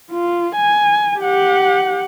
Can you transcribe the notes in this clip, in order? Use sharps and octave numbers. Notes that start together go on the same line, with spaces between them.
F4
G#5
G4 F#5